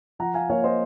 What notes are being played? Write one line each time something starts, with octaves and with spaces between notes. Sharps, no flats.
F3 F#5 A#5
F5 G#5
A#3 C#5 F5
C5 D#5